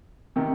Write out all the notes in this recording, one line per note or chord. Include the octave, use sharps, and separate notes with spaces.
C3 D#3